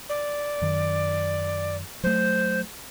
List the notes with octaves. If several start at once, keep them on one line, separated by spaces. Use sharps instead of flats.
D5
F#2 D#3
F#3 A3 C5